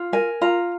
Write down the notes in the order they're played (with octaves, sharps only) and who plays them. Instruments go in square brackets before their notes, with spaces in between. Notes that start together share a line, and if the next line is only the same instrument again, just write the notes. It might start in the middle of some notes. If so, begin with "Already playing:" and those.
Already playing: [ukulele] F4
A#4 G#5
F4 A#5